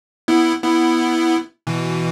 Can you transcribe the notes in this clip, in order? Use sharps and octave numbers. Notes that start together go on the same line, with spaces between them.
B3 E4
B3 E4
B2 E3